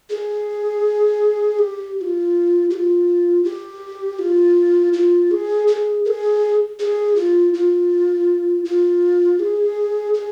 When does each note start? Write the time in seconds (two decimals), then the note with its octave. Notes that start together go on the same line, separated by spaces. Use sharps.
0.10 G#4
1.59 G4
1.96 G4
2.01 F4
2.70 G4
2.74 F4
3.44 G4
4.19 F4
4.93 F4
5.31 G#4
5.67 G#4
6.05 A#4
6.08 G#4
6.79 G#4
7.16 F4
7.54 F4
8.65 F4
9.39 G#4
10.14 G#4